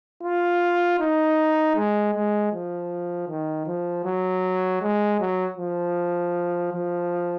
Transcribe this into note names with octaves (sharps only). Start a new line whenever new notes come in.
F4
D#4
G#3
G#3
F3
D#3
F3
F#3
G#3
F#3
F3
F3